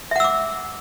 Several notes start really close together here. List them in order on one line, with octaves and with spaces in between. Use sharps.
E5 F#5 E6 D6